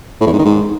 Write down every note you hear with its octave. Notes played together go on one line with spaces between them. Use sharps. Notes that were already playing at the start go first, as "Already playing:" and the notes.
A2
E2
G#2
D#3
G#2